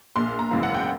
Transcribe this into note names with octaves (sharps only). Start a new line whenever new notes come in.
A#1 A#2 C6
A#5
G#1 F#2 C#3 E3 F5
F#5
G5